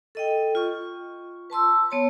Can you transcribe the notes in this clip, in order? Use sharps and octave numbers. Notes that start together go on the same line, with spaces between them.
A4 D#5 G5
F4 C#6
B4 A5 C6 E6
B3 C#5 A5